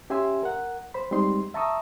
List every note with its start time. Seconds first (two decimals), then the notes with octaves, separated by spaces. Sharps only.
0.10 C#4 G4 E5 G#5 C6 E6
0.43 A#4 F#5
0.94 C5 B5
1.11 G3 G#3 C4 D#4 C6
1.54 E5 A5 A#5 C#6 D#6 E6